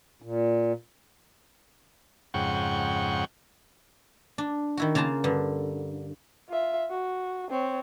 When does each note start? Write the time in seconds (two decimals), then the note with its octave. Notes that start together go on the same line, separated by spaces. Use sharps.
0.22 A#2
2.34 F2 G#2 C#3 F#5 G5 C#6
4.38 D4
4.77 D#3 E4 F#4
4.95 C#3 A#3 F4 A5 A#5
5.24 G2 D3
6.49 F4 E5
6.90 F#4
7.50 C4 C#5